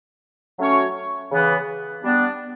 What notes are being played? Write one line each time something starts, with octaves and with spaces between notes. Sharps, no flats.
F#3 A3 C#4 F#4 C#5
C#3 E3 B3
G3 B3 D4